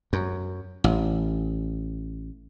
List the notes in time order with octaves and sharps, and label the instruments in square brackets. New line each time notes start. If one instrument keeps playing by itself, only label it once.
[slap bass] F#2
A1